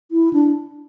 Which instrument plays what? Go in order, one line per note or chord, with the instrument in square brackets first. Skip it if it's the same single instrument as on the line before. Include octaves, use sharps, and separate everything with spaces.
[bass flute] E4
D4